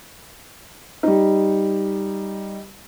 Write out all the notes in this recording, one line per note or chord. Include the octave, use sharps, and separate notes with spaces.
G3 D#4